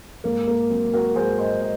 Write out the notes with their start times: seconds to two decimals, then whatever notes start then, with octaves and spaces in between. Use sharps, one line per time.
0.24 G#2 A#3
0.48 A#3
0.70 F#3 C4
0.94 F#4 A#4
1.15 G#2 G#4 C5
1.39 C5 D#5
1.61 D#5